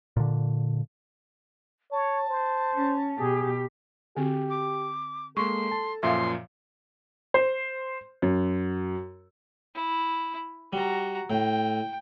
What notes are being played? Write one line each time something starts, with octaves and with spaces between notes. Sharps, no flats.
A#2 D3
C#5 A5
C5
C#4
B2 G4 G#4
D3 C4 F#4 G4
D6
G#3 A#3 A4 C6 C#6
A5
F#2 A#2 F3 E5 F5 C6
C5
F#2
E4
G3 F#4 A#5
A2 G5